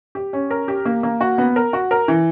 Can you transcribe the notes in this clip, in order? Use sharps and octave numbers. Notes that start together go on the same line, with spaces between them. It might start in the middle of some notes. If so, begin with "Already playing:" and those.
G4
C#4
A#4
G4
A#3
A#3
F#4
B3
A#4
F#4
A#4
E3